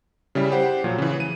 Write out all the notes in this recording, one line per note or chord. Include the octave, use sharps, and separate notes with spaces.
C#3 G3 E4
G4 C5 F#5
A#2 F3 F#3
C#3 E3
D#7